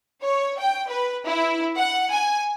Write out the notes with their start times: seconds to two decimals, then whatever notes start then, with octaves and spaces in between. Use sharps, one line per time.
0.21 C#5
0.59 G5
0.88 B4
1.27 E4
1.78 F#5
2.12 G#5